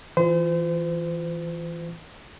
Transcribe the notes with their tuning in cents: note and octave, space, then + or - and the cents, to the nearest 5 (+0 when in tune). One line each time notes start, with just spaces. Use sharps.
E3 +0 F4 +0 C5 -35